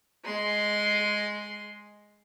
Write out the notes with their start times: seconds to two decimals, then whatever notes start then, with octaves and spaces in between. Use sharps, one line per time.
0.24 G#3 C6